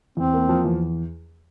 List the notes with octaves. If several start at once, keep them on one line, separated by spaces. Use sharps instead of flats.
E2 C4
A#3
F3
E2